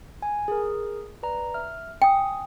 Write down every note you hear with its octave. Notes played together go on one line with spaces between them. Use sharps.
G#5
G#4 A#4
B4 D5 A#5
E5 F6
G5 G#5 D#6